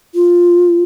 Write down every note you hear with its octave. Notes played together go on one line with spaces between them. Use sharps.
F4